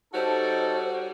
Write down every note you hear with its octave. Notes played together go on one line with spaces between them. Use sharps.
G3 D#4 F#4 A4 C5 C#5